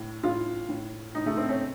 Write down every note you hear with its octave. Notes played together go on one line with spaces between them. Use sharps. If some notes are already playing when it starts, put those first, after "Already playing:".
Already playing: A2
A2 F4
A2
A2 D#4
A3
C4
C#4